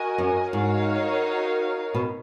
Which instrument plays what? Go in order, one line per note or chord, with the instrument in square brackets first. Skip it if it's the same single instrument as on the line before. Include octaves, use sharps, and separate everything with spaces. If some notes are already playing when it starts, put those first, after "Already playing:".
Already playing: [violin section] F#4 A#4 D#5 G#5
[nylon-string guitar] F#2
[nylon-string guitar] G#2 [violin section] D#4 F#4 A#4 C#5 F5
[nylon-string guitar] B2